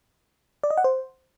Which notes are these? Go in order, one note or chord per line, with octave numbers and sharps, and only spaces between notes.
D5
D#5
F#5
C5